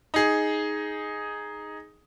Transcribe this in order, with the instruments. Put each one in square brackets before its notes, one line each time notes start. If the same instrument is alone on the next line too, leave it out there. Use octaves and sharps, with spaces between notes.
[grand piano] D#4 G#4